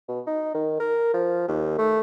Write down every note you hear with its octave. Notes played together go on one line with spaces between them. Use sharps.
B2
D#4
D#3
A#4
F3
D#2
A3